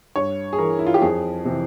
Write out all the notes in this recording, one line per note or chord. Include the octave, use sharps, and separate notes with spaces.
G2 C#5
G#4
E3 A#4
E4
F4
G4
F2 G#4
C3 E3